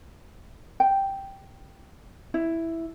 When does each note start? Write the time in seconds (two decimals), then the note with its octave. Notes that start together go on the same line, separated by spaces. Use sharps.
0.80 G5
2.34 E4